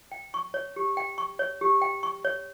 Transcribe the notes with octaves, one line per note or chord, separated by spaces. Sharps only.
G5
C#6
C#5
G4
G5
C#6
C#5
G4
G5
C#6
C#5